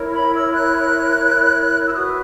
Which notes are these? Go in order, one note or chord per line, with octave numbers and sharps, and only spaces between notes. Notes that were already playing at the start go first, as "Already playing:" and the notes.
Already playing: E4 A#4 C#5
B5
E6
F#6
E6
F#4 B4 D#6